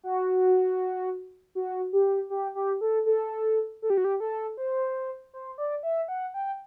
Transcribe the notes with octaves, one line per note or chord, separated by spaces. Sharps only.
F#4
F#4
G4
G4
G4
A4
A4
A4
G4
F#4
G4
A4
C5
C5
D5
E5
F#5
G5